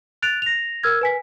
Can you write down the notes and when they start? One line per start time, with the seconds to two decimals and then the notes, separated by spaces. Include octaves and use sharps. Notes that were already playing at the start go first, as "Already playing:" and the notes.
0.22 F#6 A6 D7 F7
0.42 A#6 F7
0.83 A#4 E6 F6 G#6
1.01 B4 G#5 B6